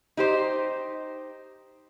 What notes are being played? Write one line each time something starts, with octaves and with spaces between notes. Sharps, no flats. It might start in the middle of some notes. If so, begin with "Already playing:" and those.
D#4 G4 C5